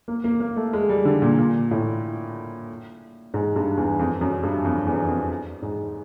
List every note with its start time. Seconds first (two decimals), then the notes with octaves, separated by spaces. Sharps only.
0.08 A#3
0.24 A#3
0.40 A#3
0.56 A3
0.73 G#3
0.89 G3
1.05 D3
1.22 A#2
1.39 A#2
1.71 A2
3.34 G#2
3.56 G2
3.77 E2
3.99 F2
4.21 F#2
4.43 G2
4.64 F2
4.86 E2
5.08 F2
5.62 G#2